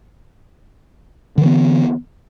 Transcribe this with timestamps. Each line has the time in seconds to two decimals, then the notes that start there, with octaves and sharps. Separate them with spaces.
1.38 D3
1.42 E3
1.46 B3